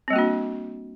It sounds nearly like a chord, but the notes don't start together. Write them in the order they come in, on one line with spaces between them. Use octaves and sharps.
C4 G3 A#3 F#4 D4